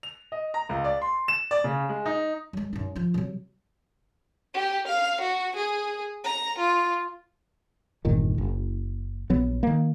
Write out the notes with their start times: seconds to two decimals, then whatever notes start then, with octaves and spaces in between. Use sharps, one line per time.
0.03 F7
0.32 D#5
0.54 A#5
0.69 C#2
0.84 D5
1.02 C6
1.28 E7
1.51 D5
1.64 C#3
1.89 G#3
2.06 D#4
2.53 F#3 G#3
2.73 F#2 D#4
2.96 F3 F4
3.14 C3 F#3
4.54 G4
4.87 F5
5.21 F#4
5.56 G#4
6.24 A#5
6.58 F4
8.05 G1 E2 A#2 D#3
8.38 F#1
9.30 A#1 F#3 B3
9.63 D#3 A#3